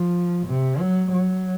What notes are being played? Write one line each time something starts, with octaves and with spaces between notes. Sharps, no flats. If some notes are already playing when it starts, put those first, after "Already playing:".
Already playing: F3
C3
F#3
F#3